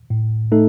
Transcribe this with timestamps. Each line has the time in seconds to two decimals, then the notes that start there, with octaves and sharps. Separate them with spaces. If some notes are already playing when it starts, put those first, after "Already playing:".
0.10 A2
0.52 A3 D#4 A4